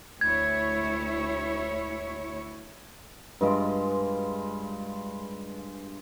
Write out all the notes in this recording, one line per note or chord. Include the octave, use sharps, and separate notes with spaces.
D2 E4 C#5 G#6
G2 G#3 F4 D6